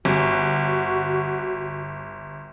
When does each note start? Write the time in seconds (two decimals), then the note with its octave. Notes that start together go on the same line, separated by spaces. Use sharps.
0.05 G1 F#4